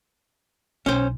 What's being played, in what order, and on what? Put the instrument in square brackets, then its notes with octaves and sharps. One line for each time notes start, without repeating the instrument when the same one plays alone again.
[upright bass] B1 [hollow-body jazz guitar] C#4 C5